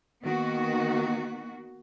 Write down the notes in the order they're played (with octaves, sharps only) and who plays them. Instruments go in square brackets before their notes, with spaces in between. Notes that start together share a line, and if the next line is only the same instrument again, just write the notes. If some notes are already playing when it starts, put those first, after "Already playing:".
[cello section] D#3 A#3 B3 F#4